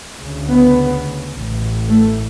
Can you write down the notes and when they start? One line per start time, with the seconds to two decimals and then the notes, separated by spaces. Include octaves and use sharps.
0.20 D2 C#3
0.48 B3
1.32 A1 A2
1.89 A3